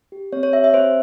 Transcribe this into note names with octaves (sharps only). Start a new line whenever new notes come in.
G4
C4 C#5
C#5
G4 E5
E5
C4 C5